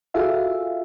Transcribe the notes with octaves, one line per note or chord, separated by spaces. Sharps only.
F4 F#4 G#4 A4 E5 F5